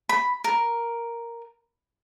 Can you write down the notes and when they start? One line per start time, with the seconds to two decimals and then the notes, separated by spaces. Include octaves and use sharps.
0.09 B5
0.44 A#4